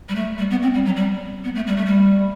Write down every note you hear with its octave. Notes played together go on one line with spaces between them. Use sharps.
G3
A3
G3
B3
C4
G3
F#3
G3
B3
A3
G3
A3
G3